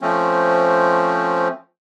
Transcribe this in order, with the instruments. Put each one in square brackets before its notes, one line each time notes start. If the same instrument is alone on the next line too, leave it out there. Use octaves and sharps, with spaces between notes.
[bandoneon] F3 A3 C4 C#4